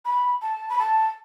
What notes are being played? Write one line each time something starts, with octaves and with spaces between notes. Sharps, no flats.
B5
A5
B5
A5